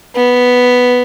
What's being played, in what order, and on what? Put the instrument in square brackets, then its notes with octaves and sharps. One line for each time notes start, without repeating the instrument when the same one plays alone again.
[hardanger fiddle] B3